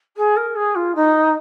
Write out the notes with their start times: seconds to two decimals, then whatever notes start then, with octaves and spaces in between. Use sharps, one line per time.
0.16 G#4
0.36 A#4
0.55 G#4
0.75 F4
0.95 D#4